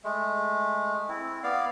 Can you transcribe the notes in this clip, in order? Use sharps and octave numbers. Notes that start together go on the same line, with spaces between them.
G#3 A3
C4 E4
B3 D5 F5